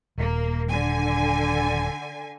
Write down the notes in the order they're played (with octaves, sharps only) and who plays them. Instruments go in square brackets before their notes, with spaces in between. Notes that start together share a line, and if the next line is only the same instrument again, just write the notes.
[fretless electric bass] D#1 [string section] A#3
[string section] D3 G#5